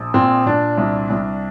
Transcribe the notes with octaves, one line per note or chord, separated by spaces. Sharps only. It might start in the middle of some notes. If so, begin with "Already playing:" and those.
Already playing: A#1
A#2 C4
A#2 D4
C2
C2